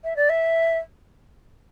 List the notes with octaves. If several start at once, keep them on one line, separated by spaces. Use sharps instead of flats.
E5
D5
E5